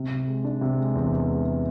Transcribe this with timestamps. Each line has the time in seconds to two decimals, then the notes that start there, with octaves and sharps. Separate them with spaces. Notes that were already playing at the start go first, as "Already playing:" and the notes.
Already playing: C3
0.11 C3
0.28 G#3
0.44 D4
0.61 C3
0.78 G#3
0.95 E2
1.12 E2
1.29 G#3